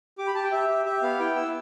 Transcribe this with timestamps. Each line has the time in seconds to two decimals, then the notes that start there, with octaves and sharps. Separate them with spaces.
0.18 G4 D6
0.27 B5
0.35 G4 A5
0.44 G5
0.52 G4 E5
0.69 G4
0.85 G4 E5
1.02 B3 F5
1.19 E4 G5
1.36 E4 E6